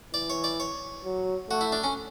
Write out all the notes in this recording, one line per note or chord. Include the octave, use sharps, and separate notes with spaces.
E3 D5
C#5
D5
C#5
F#3
A3 F#4
E4
D4
C#4